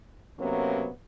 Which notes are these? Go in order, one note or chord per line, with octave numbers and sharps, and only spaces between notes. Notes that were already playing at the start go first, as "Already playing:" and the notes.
C3 F#3 A#3 B3 C#4